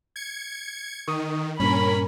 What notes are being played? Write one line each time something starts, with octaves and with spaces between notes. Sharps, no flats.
G#6 C#7
D#3 C#6 D#6
G2 A#2 C#4 A#4 B5